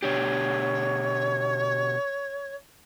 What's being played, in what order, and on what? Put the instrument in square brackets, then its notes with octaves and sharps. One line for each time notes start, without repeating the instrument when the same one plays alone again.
[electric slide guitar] B2 D4 G4 [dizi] C#5